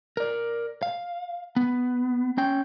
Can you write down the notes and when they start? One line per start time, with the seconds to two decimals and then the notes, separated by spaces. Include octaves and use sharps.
0.17 A#4 D5
0.83 F5
1.56 B3
2.38 C#4 G5